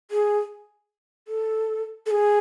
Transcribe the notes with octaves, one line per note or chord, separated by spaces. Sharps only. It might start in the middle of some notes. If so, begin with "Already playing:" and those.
G#4
A4
A4
G#4